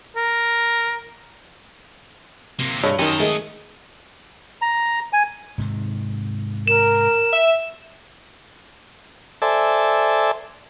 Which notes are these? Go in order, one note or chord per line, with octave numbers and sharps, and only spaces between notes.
A#4
C3 A#3
G2 G#4 A4 C#5 D#5
F#2 D#3 G4 A4 D#5
D#3 G#3 A3 G#4
A#5
G#5
G#2 C3 D#3
A#4 E7
E5
A4 C5 D5 E5 G#5 A5